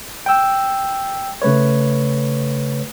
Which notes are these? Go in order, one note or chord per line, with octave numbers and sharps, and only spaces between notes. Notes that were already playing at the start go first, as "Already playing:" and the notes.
G5 E6
C#3 A3 B4 C#5